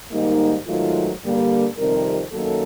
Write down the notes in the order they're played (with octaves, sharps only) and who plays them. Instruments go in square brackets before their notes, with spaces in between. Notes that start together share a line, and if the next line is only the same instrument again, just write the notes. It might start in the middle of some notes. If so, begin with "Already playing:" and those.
[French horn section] G#2 D#3 G3 A#3 D#4
G#2 D#3 F#3 A3 F4
G2 D3 G3 A#3
F2 C3 D#3 G3 A#4
F#2 D#3 F#3 A#3 A4